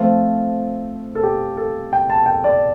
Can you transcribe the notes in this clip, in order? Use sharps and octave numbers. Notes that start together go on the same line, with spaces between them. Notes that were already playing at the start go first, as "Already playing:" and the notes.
Already playing: F3 A3 C4 F4
A4
G4
A4
G5
A5
G5
D5